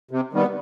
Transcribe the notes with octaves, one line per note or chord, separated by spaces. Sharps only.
C3
D#3 G3 B3